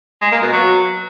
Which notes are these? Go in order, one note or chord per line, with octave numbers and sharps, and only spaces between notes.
G#3
A#3
B2
F#3